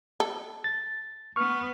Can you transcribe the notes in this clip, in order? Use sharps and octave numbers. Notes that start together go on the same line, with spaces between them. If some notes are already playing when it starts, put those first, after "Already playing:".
A4
A6
B3 C#6 F6